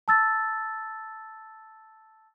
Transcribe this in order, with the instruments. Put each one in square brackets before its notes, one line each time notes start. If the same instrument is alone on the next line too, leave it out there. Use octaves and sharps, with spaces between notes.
[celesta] A5 E6 A6